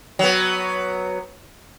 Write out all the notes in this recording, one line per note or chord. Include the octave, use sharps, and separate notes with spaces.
F#3 B3